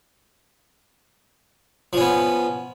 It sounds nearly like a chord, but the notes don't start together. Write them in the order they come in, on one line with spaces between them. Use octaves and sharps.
F3 C#4 B3